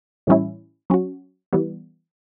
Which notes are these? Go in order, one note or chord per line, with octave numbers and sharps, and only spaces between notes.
A2 E3 G3 C#4 E4
F#3 C#4 F#4
E3 G3 B3